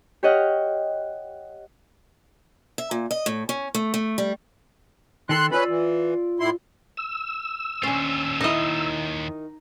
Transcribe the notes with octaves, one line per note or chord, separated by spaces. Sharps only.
G4 C#5 D#5 F#5 F6
E5
A#2
D#5
A2
C#4
A3
A3
G3
D#3 A4 C6 F#6
C#4 F4 B4 D5 B5 E6
E3
A2 E4 C6
E6
D#2 C#4 D4 F4
D#3 D#4 E4 D#5